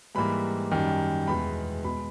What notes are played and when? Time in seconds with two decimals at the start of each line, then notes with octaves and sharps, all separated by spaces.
0.15 G#2 E3 G3 A#3 B5
0.72 F#2 D#3 G3
1.28 E2 B2 G#3 B5
1.84 B2 G#3 B5